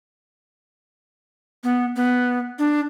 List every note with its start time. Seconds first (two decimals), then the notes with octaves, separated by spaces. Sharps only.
1.64 B3
1.96 B3
2.59 D4